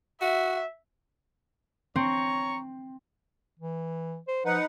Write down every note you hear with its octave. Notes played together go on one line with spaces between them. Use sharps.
F#4 E5
C4 C#5 A#5 C#6
E3
C5
F3 D#4 B4 F#5